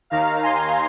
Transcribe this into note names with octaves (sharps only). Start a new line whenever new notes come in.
D#2 D#3 F5 A#5
G#5 C6